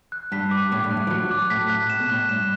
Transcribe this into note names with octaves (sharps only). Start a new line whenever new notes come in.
F#6
G2 B6
D6
A2 D6
G2
F#6
A2
E3
F#3 F#6
D6
A2 B6
F#6
A2 E7
B2
A2 F#6
G2 E7